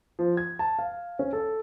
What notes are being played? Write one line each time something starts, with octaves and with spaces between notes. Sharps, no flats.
F3
G#6
A5
F5
C#4
A4